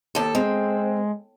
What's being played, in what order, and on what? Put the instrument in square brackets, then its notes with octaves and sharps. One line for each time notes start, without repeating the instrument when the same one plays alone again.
[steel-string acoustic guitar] D#2 A4
[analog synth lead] G#3 [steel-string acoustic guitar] C4